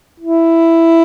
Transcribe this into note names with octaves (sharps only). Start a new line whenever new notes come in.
E4